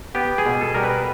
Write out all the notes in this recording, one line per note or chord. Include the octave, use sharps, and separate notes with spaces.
B3 G4
G#4
B2
A4
G3 A#4
B4